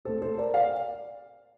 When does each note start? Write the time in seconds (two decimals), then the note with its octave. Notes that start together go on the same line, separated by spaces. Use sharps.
0.05 A#2 A3 C4 A4 C5
0.22 A4 C5
0.38 A#4 D5
0.54 D5 F5